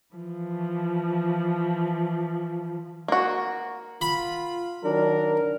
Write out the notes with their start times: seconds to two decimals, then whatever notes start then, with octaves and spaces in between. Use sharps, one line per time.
0.16 E3 F3
3.08 A#3 F#4
4.01 F4 B5
4.84 D#3 F#3 D4 A#4